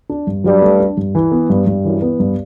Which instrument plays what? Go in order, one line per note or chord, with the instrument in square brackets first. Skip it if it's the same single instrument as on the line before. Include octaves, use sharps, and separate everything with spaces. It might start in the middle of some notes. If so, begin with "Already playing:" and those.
[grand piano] D4
G2
[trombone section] G2 G3 [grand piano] F#3
[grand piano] A3
D4
G2
E3
B3
G2
G2
[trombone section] F#2 F#3 [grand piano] E3
[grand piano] B3
G2